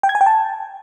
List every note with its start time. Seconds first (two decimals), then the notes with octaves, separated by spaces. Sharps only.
0.03 G5
0.09 G#6
0.15 G#5
0.21 G5
0.26 A5